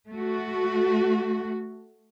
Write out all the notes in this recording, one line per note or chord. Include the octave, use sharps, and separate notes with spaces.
A3 F#4